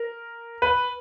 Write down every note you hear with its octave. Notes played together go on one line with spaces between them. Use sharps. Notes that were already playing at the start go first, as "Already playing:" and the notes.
Already playing: A#4
B4